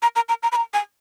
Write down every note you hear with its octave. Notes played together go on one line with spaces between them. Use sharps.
A#5
A#5
A#5
A#5
B5
A#5
G#5